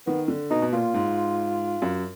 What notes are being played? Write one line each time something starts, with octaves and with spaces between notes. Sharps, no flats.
D#3 B3
D3
B2 D#4
B2
A#2 F4
G#2
F#2